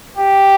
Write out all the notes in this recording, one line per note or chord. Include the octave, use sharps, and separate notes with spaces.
G4